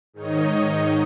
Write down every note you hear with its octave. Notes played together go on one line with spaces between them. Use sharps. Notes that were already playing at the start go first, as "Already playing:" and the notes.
G#2 D#3 D#4 C#5 D#5